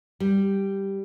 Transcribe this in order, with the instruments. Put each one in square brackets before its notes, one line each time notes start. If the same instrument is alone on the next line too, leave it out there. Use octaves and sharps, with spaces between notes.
[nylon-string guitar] G3